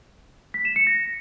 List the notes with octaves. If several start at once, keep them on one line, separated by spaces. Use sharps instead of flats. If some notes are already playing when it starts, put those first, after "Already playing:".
B6
E7
C#7
A#6